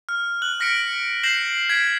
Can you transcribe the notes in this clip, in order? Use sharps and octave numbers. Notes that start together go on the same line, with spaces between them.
F6
F#6 F#7
F6 A#6 B6 C#7 D7
G6 A#6 C7 E7 F#7
G#6 B6 D7